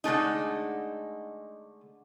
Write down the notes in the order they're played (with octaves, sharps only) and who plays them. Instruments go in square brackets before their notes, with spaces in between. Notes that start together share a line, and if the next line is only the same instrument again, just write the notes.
[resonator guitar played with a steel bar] D3 G#3 A3 D#4